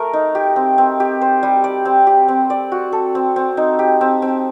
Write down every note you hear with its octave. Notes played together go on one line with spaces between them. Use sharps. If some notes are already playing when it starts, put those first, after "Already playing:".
Already playing: A3 A#4
D#4
G4
C4
C4
G4
C5
G3
D5
C4
G4
C4
D5
F#4
A4
C4
C4
D#4
G4
C4
C4